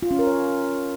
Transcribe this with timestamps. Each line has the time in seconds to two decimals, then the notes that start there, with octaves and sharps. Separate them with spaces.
0.03 F4
0.11 C#4
0.19 A#4
0.27 C#5